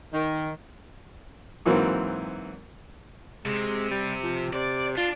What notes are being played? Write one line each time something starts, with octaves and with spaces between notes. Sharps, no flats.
D#3
G#2 E3 F#3 A#3 C4
C3 G#3
G3
F3
C3 D5
D4 F4